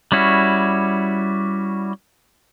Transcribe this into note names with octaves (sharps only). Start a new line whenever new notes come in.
G3 C#4 E4 F#4